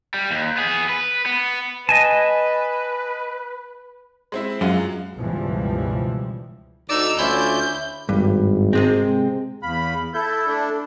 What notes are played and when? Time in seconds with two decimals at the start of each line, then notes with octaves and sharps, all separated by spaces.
0.14 G3
0.31 D#2
0.57 B3 G#4
0.89 B4
1.26 B3
1.89 B4 D#5 G#5 A5
4.32 G#3 C4 E4
4.61 F#2 G#3 F4 F#4
5.17 C#2 G2 B2 E3 F3 G3
6.90 D2 D#4 D5 E6
7.19 D2 C#4 E4 F4 D5 G6
8.09 G#1 G2
8.73 C3 G#3 C4
9.63 E2 F5 B5
10.14 E4 A4 G6
10.47 A3 D4